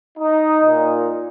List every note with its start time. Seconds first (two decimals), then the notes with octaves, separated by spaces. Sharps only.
0.17 D#4
0.63 A#2